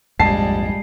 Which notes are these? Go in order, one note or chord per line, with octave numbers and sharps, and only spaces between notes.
A#1 F2 G#2 G3 G#3 A5 C7